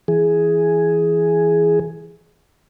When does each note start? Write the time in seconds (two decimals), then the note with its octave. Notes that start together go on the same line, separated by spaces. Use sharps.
0.08 E3 G#4